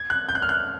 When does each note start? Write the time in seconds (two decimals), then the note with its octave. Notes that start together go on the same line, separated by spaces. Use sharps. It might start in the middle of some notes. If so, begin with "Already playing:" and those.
Already playing: G#6
0.10 F#6
0.29 G6
0.35 F#6
0.42 F6
0.49 F#6